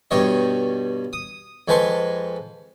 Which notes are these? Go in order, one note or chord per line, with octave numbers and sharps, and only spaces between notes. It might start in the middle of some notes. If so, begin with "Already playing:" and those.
G2 B2 G3 C#5 D#5
D#6
F2 G#3 B4 A5 C6 C#6